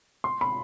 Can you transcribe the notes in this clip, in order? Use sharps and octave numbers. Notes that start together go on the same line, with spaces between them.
C6
B5